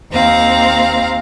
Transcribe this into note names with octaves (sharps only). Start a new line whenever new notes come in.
D#2 C4 F5 A#5